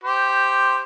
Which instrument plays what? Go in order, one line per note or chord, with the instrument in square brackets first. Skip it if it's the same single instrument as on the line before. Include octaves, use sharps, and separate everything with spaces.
[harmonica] G4 C5